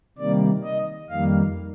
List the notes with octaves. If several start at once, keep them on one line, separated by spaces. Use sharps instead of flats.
C3 D#3 G3 A#3 D5
D#5
F2 D#3 G3 A#3 F5